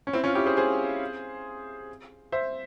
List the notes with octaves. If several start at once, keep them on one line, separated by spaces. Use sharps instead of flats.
C#4
C4 E4
C#4 F4
E4 G4
G#4 C5
G#4 C5
C5 E5